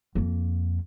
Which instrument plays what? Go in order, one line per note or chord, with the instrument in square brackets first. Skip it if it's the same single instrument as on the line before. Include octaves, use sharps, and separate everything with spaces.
[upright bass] F2 A#3